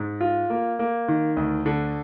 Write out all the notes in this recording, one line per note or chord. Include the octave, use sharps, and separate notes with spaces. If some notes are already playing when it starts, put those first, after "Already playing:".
Already playing: G#2
F4
A#3
A#3
D#3
D2
D3